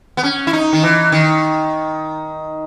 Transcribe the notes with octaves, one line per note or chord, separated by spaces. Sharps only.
B3
C#4
E4
D#4
D#3
E3
D#3